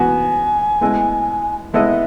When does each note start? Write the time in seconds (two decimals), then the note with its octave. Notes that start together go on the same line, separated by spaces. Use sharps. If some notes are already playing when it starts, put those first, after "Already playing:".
Already playing: E3 B3 F#4 G#5
0.81 G#3 B3 E4 A4 D#5
1.74 G#3 B3 E4 A4 D#5 E5